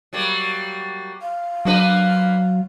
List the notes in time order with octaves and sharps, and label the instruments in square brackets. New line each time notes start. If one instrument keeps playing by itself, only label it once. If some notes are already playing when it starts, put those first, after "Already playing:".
[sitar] F#3 G3 A#3
[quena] F5
[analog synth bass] F#3 [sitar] A#3 D4 B4